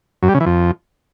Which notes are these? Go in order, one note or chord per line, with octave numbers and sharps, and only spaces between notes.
F#2
G3
C#3
E3
F2